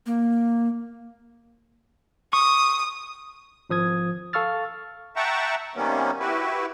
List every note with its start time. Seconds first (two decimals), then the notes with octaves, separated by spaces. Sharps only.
0.06 A#3
2.33 C#6 D#6
3.70 G#1 F3 D#6 G#6
4.33 A4 F5 C#6 E6 F6 A6
5.16 E5 F#5 G5 A5 A#5 C#6
5.76 C3 D#3 G3 A#3 B3 C#4
6.20 E4 F#4 G4 B4